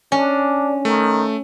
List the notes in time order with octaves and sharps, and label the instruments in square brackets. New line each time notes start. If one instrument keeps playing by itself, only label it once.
[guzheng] C#4 [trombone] D4
[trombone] D#3 [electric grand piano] A3